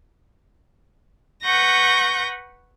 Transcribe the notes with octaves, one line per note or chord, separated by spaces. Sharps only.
B4 F#5 C#6 G6 A#6